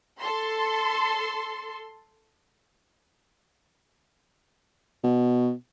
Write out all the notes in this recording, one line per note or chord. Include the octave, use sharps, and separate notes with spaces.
A4 C6
B2